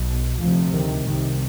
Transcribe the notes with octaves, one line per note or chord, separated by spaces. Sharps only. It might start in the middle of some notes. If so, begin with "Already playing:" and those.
Already playing: B1 B2
D2 C3 F3
D#3
C2 C3 D#3